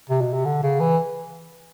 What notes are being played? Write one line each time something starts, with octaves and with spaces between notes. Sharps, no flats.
C3
B2
C3
D3
C#3
E3